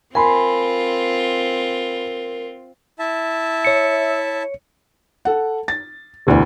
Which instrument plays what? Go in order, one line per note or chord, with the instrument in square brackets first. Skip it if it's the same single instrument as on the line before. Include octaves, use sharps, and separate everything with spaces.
[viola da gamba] C4 F4 [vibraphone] A#4 [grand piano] G#5 B5 C6
[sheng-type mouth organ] E4 E5 A5
[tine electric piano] C#5 C#7
[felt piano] A4 F#5
A6
E1 D2 E3 E4